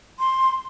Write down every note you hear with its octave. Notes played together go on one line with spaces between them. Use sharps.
C6